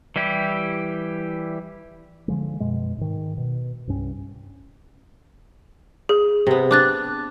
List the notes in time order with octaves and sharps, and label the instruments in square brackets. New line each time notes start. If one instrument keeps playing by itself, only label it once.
[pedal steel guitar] E3 G3 E4 G4
[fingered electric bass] D3 F3 G#3
F#2 B2 G#3
G#2 D#3
B2
C2 G2 C#4
[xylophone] G#4
[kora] C3 B3
[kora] D4 [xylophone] D6 F#6 A6